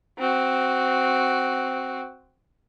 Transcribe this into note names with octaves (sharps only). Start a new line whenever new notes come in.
C4 F#4